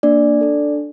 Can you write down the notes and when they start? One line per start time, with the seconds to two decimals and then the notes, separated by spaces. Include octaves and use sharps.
0.03 A#3 D4 D5
0.41 D4 A4